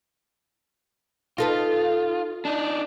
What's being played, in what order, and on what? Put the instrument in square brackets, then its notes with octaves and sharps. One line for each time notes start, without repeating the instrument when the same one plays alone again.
[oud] D#4 A4 B4 [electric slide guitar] F4
[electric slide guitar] D4 D#4